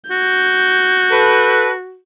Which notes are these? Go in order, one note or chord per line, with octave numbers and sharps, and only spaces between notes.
F#4 G6
A4 B4